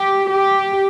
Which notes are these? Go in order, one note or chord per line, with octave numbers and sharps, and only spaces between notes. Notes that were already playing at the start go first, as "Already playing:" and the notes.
Already playing: G4
G4